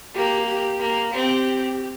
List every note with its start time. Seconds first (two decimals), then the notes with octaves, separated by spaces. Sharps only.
0.14 A#3 G4
0.47 G4
0.79 A#3
1.13 C4 G4